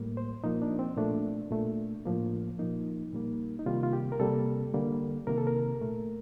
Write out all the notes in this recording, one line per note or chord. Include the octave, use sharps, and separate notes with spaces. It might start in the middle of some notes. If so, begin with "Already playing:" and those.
Already playing: A2 G3 A#3
C5
A#2 F3 A#3 D#4
D4
C4
A#2 A3 D4
A#2 A3
A2 F3 A#3
A#2 F3 A#3 D#4
A#2 G3 A#3
D#4
C3 D#3 G3 A#3 F4
F4
G4
A#4
C3 G3 A#3 A4
D3 G3 A#3
C3 D#3 A#3 A#4
A4
A#4
A#2 A3